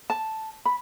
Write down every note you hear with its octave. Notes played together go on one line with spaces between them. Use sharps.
A5
B5